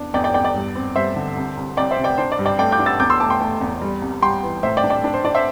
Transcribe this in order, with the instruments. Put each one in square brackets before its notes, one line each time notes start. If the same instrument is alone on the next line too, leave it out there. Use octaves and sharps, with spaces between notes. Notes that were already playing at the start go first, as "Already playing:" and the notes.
Already playing: [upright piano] E2 D4
E2 D5 G5
D5 G5
E2 D5 G5
D5
G2
C4
G2 C5 E5
D3
C2
C2
C2 D5 G5
C5 E5
C3
D5 G5
D4 C5
D5
G2
D5 G5
A3 D5 G5
D6 G6
D4
E6 A6
E2 D6 G6
C6 E6
A3 A5 D6
G5 C6
A3
E2
G3
C2
G3 G5 C6
E3
A2 C5 E5
D5 G5
D4
D5 G5
D4
C5
D4 D5
C5 E5